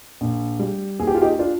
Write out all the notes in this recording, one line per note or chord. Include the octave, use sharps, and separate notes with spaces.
A#1
G3
D#2 G#4
G4
F4
D#4 G4
D4 F4